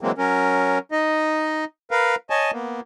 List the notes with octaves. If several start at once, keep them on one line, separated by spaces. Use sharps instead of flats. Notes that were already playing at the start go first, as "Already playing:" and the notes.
E3 F#3 G#3 A#3 C4
F#3 C#4 A#4
D#4 D#5
A#4 B4 F5
C#5 D#5 G#5 A5
A#3 B3